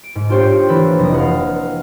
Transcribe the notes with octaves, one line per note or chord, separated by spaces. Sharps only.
D7
G#2
D4 F4 G4 C5 C#5
E3 A#3 A4 B4
F1 D#5
F5 F#5